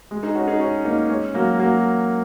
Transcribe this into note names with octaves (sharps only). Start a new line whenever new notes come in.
G#3
D#4 G#4
C#4 F#4
D#4 G#4
C#4 F#4
A#3 D#4
G#3 C#4
F#3 A#3
F#3 A#3